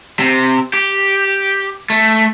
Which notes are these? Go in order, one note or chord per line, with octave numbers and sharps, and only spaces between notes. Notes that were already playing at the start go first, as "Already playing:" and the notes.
C3
G4
A3